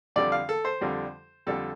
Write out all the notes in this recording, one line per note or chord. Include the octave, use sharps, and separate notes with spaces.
F2 D3 G3 D5
F5
A4
C5
F2 D3 G3
F2 D3 G3 A4